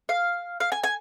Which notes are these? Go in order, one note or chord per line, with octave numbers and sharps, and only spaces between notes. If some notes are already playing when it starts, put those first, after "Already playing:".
F5
F5
G#5
G#5